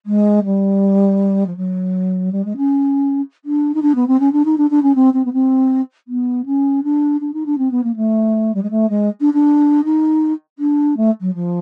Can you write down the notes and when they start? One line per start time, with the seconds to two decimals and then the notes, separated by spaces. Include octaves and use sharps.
0.06 G#3
0.44 G3
1.46 F3
1.56 F#3
2.32 G3
2.44 G#3
2.56 C#4
3.45 D4
3.74 D#4
3.82 D4
3.95 B3
4.07 C4
4.19 C#4
4.32 D4
4.45 D#4
4.57 D4
4.70 D4
4.82 C#4
4.95 C4
5.13 C4
5.25 B3
5.33 C4
6.07 B3
6.45 C#4
6.83 D4
7.20 D4
7.33 D#4
7.45 D4
7.58 C4
7.71 B3
7.83 A#3
7.96 A3
8.54 G3
8.62 G#3
8.70 A3
8.89 G#3
9.20 D4
9.33 D4
9.84 D#4
10.58 D4
10.97 A3
11.20 F#3
11.34 F3